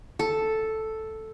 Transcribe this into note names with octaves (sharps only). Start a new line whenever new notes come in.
A4